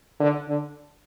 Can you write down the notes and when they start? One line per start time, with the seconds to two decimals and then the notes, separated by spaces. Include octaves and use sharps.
0.20 D3
0.48 D3